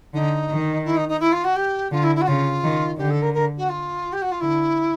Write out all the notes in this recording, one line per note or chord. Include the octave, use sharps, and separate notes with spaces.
D3 D#4
D#3
E4
D#4
D#4
E4
F4
F#4
G4
D3 F4
E4
E4
F#4
C#3 F4
D#3
D3 G4
A4
A#4
A#4
F#4
F4
G4
F#4
F4
D3 E4